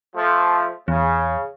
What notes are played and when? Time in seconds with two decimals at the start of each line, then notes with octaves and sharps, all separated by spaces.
0.15 F3 A3
0.88 E2 C#3